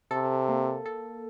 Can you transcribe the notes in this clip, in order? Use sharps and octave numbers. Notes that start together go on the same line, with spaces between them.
C3 A4
A#3
A4